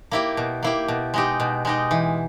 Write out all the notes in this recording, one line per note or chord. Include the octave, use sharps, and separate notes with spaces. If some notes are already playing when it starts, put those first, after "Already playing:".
A#3 E4 G4
B2
A#3 E4 G4
B2
G#3 D#4 G4
B2
G#3 D#4 G4
E3